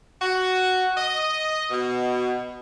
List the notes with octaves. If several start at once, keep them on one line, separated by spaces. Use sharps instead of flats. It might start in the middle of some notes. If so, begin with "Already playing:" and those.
F#4
D#5
B2